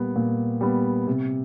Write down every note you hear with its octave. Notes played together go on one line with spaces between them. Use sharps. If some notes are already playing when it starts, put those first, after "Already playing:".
Already playing: A#2 G3 B3
A#2
G3 B3
C3